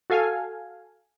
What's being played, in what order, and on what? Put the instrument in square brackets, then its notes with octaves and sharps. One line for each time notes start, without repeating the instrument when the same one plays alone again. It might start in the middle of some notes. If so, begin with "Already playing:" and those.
[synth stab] F#4 A4 F5 G#5